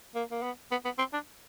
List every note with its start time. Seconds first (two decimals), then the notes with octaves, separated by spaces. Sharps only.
0.15 A#3
0.31 A#3
0.42 B3
0.71 B3
0.85 B3
0.98 C4
1.13 D4